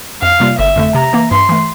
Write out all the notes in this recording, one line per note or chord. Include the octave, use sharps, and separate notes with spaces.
F2 F5
C3 G3 A#3 F4
G1 E5
F2 D3 A3
C3 A#5
E3 A#3
G2 C6
E3 A3